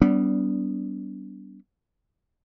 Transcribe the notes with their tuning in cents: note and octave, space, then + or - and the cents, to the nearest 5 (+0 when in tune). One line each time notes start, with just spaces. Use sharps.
G3 -20 B3 +0 D4 -30